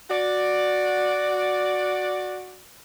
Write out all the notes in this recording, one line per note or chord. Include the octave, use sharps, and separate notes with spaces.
F#4 D5